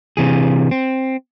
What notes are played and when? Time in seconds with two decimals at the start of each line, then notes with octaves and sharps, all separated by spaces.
0.17 C3 E3 G#4
0.71 C4